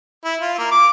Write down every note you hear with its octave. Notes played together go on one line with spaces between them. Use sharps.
E4
F4
A#3
D6